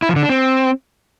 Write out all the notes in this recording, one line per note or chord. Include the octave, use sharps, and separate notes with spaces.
E4
F3
D3
D4
C4